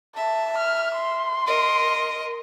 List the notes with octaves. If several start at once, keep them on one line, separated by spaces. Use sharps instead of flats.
E5 A5
F6
C6
A#4 D#5